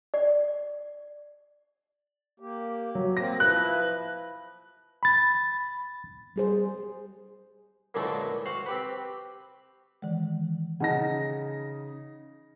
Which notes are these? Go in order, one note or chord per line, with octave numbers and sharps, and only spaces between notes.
D5
A#3 G4
F#3
A#3 C4 A#6
F3 E4 B4 F#6
B5 A6
G3 G#4 C5
F#2 A#2 D3 E3 G#3 A3
F#4 C5 F5 F#5
C4 G4 B4
D#3 E3 G#3
C#3 D#4 F#5 A5 B5 A#6